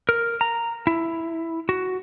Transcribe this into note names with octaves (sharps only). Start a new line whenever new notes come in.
A#4
A#5
E4
F#4